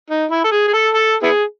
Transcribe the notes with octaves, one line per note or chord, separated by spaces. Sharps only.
D#4
E4
A4
G#4
G#4
A4
A4
B3 E4 G#4